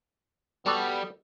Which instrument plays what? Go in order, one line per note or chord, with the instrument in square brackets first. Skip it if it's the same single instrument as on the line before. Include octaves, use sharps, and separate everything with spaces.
[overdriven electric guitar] G3 [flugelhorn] B3 [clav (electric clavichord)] F#4 A4 D5